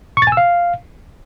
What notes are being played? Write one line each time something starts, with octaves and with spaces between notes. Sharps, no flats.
C#6
A6
G#5
E6
F5